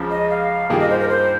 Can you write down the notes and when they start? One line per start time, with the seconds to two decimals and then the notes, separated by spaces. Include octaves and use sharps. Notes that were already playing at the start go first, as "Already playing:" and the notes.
Already playing: C#2 C#3 F3
0.11 D#5
0.30 F5
0.70 G2 D#3 A#3 F4 G#4 G5
0.80 D#5
0.90 C5
1.00 A#4
1.09 C5